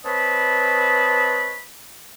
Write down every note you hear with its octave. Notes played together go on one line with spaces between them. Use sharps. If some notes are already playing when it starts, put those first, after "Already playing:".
C4 B4 C#5 D#5 A5 B5